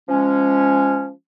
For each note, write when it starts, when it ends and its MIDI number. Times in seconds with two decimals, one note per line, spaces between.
0.09 1.11 53
0.09 1.11 56
0.09 1.11 61